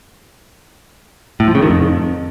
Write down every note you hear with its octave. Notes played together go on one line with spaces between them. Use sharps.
A2
F3
C#3
D#3
F2